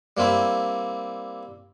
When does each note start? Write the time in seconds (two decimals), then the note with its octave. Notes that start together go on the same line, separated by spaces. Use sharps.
0.17 G3 A#3 C4 E4